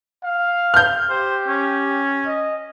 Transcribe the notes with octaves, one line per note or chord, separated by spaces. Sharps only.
F5
F6 G6
G4 C5
C#4
D#5